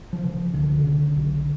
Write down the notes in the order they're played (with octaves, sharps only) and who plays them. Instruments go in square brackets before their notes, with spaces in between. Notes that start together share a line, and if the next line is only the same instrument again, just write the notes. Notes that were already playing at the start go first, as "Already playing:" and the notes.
[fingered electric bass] F3
C#3
C#2 D3
C#3
B1